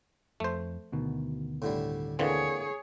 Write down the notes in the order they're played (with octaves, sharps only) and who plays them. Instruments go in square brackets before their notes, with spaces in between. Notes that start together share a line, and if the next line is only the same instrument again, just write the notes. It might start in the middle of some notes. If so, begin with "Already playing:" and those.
[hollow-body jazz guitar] F2 [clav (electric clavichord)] A3 C5
[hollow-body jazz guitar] D2 B2 D#3
[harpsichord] A2 D3 G3
[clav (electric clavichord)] D3 E3 C4 [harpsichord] A#3 [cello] G#4 C#5